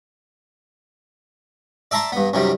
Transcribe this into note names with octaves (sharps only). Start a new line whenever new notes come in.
D5 E5 A5 A#5 C6
G2 B3
F#2 C3 D#3 G3